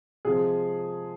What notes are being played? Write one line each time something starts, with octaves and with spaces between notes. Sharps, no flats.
C3 F3 G#3 G#4